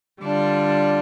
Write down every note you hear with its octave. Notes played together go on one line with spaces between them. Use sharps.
D3 G3 D4 F4